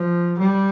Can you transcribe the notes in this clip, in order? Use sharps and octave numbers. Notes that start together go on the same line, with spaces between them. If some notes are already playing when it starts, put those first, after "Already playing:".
Already playing: F3
G3